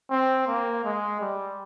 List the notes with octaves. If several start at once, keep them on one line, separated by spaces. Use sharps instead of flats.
C4
A#3
G#3
G3